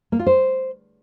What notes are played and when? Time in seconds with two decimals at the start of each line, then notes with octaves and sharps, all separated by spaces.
0.12 A#3
0.19 F4
0.26 C5